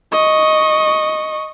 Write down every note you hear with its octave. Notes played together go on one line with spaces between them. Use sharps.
D#5 C#6